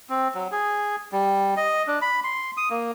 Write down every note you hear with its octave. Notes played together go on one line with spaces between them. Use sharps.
C4
F#3
G#4
G3
D#5
D4
B5
C6
D#6
A#3